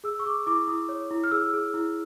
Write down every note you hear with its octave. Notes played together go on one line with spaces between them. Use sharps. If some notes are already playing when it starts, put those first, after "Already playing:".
G#4 E6
C#6
G#4 D6
E4 D6
E4 D#6
C#5
E4
F6
G#4 E6
G#4
E4